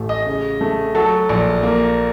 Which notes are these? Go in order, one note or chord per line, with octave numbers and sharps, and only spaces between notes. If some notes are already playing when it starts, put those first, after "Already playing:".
Already playing: A1 A3
D#5
C#3
A3
F#3 A4
A#1
A#3